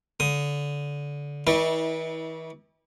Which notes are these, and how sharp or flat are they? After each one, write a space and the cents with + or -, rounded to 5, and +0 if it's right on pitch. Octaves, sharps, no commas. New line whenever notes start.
D3 -25 D#6 +5
E3 -40 E4 -25 D5 +30